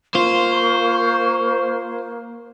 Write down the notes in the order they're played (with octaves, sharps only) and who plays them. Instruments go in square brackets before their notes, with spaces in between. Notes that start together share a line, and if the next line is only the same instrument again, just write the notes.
[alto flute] A#3 [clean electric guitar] F4 [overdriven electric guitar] C5 [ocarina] C#6